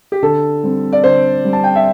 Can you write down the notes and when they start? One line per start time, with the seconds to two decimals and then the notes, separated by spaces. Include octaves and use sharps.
0.12 G4
0.22 D3 A4
0.63 G3 C4
0.93 D5
1.04 D3 C5
1.45 G3 C4
1.53 A5
1.64 G5
1.76 E5